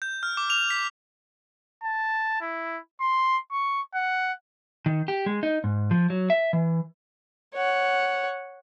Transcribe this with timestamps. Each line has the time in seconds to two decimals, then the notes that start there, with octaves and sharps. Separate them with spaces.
0.02 G6
0.23 F6
0.37 D6
0.50 F7
0.70 B6
1.83 A5
2.41 E4
3.01 C6
3.52 C#6
3.95 F#5
4.86 D#3
5.08 G4
5.26 G#3
5.43 D#4
5.64 G#2
5.91 F3
6.10 F#3
6.30 E5
6.53 E3
7.54 C#5 F#5